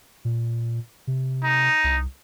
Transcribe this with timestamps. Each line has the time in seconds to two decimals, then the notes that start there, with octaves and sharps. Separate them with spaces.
0.25 A#2
1.07 C3
1.44 D#4
1.84 C2